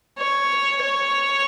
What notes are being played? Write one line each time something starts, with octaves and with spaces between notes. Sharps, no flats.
C#5
C#5